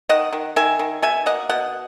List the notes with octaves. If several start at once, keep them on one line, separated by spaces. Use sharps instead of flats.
D#3 D#5 F#5
D#3
D#3 E5 G#5
D#3
B2 E5 G#5
A#3 D#5 F#5
B2 D#5 F#5